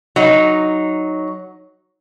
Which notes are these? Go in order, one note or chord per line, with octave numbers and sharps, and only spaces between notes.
F#3 D#4